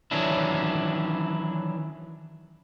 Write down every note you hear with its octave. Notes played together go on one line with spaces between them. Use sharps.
D#3 E3 F#3 C#4 D4 E4